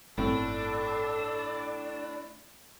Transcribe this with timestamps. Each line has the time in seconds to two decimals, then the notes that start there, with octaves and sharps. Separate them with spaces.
0.18 G1 A2 C4 D4 A4